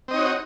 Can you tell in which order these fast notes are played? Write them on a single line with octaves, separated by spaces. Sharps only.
C4 D#5 D#4 C#5 F#4